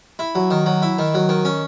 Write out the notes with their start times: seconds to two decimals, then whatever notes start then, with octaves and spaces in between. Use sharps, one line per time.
0.19 E4
0.35 F#3
0.51 D#3
0.66 F#3
0.82 E4
0.99 D#3
1.14 F#3
1.29 D#3
1.45 C#4